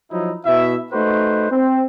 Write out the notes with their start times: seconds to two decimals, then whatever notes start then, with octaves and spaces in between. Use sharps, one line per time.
0.10 F3 F#3 D#4 E4
0.44 B2 E4 E5
0.92 A3 D#4 F#4 B4 C5
1.51 C4